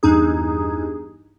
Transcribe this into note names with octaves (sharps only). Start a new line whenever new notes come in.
E2 G2 D#4 G#4